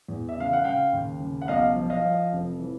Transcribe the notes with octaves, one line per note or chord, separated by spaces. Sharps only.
E2
E5
C#3 F5
F#5
C#3 F5 G5
D#2
C#3
F#5
B1 D#5 F5
F3
D#5 F5
F3
F1
E3